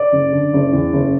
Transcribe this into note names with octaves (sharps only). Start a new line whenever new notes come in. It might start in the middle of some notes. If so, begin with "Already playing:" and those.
Already playing: D5
F#1
D3
F#1
E2
F#1